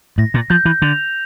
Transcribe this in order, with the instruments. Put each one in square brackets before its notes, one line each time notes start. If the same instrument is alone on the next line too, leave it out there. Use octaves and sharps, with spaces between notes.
[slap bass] A2 [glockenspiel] A#6
[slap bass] A#2
[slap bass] F3 [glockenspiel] G6
[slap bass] E3
[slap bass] D3 [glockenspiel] F7